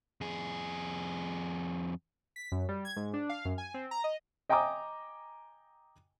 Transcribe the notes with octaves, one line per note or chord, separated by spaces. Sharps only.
F2 G#4
B6
F#2
G3
G#6
G#2
D4
F5
F#2
G#5
C4
A#5
D#5
D#5 G5 G#5 A#5 D6 D#6